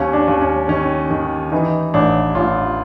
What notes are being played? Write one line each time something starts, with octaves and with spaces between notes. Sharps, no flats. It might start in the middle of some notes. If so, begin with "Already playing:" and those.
Already playing: D#2 C#4
D4
D#2
C#4
D#3 C#4
D#3
E3 D#4
A1 D4
A1 F4